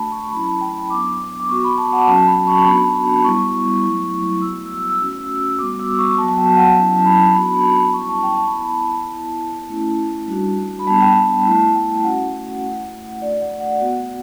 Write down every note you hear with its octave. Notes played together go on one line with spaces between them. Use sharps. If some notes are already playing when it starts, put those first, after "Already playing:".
Already playing: A3 D4 F#4 A5 B5
C#6
F#3 C#4 E4 B5
A5
G5
B5
F#3 B3 D4 D6
D6
B3 F#4 C#6
B5
A5
F#5
F#3 C#4 F#4 A5
A5
B5
C#6
B3 D4 F#4 B5
A5
B5
G3 B3 E4 C#6
F#3 A3 E4
G3 B3 F#4 E6
E6
E6
A3 C#4 F#4
E6
G3 B3 F#4 D6
E6
C#6
F#3 B3 F#4 A5
A5
G5
F#5
F#3 C#4 E4 A5
B5
B3 D4 F#4 B5
A5
B5
G3 C#4 E4 C#6
A5
G5
A5
B5
B3 E4 A5
B3 E4
A3 C#4 E4
G3 D4 F#4
B5
G3 B3 D4 A5
G5
A5
A5
A3 E4 A5
G5
A3 C#4 F#4 F#5
A3 E4
A3 D4 F#4 D5
F#5
F#5
B3 F#4